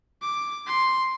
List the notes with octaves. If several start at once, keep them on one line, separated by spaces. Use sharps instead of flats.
D6
C6